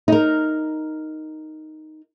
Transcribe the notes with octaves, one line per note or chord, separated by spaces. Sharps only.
D#4 A#4